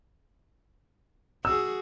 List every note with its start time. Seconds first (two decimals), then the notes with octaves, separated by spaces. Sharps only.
1.45 F#4 G#4 E6